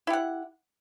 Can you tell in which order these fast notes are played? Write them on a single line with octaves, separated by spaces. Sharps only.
E4 G4 F#5